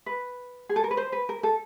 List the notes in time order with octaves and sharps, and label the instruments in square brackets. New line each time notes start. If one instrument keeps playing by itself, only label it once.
[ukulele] B4
G#4
A4
A#4
B4
C5
B4
A#4
A4